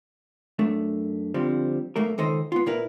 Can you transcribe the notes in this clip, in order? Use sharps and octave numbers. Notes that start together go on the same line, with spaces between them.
F#2 A3 D4
D3 F3 G3 C4
B1 A3 A#3 A#4
C#2 D#3 A4 C5 D#5
B3 F4
A#2 E4 A#4 B4